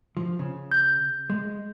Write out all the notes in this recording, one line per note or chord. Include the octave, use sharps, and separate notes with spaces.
F3
C#3
G6
G#3